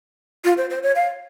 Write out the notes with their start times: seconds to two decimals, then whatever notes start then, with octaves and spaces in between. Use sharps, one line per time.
0.45 F4
0.58 C5
0.70 C5
0.83 C#5
0.95 F5